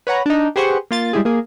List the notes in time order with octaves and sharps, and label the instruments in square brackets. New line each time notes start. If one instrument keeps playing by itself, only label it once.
[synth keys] B4 C#5 F#5 A#5
D4 D#4
G4 G#4 B4 C5 F#5 C#6
A#3 F4 A6
G3 G#3 E4 G4 G#4
A#3 G#4